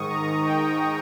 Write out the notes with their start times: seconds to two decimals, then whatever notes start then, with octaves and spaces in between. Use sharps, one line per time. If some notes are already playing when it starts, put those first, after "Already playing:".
Already playing: G#2 D#3 C#6 D#6
0.10 A#5
0.46 G5